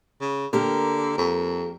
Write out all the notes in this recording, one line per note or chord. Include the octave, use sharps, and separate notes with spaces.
C#3
D3 A#3 G4 A#4
F2